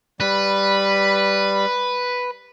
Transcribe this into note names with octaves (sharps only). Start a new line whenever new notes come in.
G3 B4